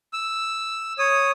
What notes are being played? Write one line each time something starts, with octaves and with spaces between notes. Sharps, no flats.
E6
C#5 D#6